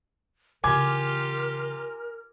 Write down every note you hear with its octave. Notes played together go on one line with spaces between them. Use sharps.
C#3 E3 F4 G4 A#4 G#5 D6 G#6